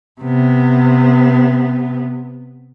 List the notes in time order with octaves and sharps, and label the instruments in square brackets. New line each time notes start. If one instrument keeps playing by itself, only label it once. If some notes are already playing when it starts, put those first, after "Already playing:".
[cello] C3 B3